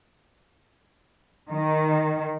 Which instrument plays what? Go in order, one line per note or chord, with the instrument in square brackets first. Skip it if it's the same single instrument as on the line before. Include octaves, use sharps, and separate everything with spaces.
[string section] D#3